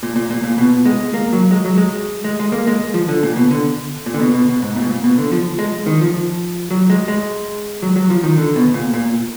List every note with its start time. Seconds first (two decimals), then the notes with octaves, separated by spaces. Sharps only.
0.03 A#2
0.16 A#2
0.31 A#2
0.44 A#2
0.58 B2
0.85 G#3
1.14 A#3
1.33 F#3
1.51 G#3
1.65 F#3
1.78 G#3
2.24 G#3
2.40 G#3
2.52 A#3
2.67 G#3
2.94 F3
3.09 D3
3.23 A#2
3.36 B2
3.51 D3
4.06 A#2
4.14 D3
4.20 B2
4.34 B2
4.48 B2
4.62 G#2
4.76 A#2
4.82 B2
4.89 A#2
5.04 B2
5.18 D3
5.32 F3
5.59 G#3
5.86 D#3
6.01 F3
6.71 F#3
6.90 G#3
7.08 G#3
7.82 F#3
7.96 F#3
8.10 F3
8.23 D#3
8.37 D3
8.56 B2
8.74 A#2
8.93 A#2